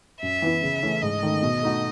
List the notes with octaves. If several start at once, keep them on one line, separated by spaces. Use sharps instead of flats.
F#2 E5
E3 B3 E4
C#3
E3 A3 C#4 E4
G#2 D#5
D#3 A3 D#4
B2
A3 D#4 F#4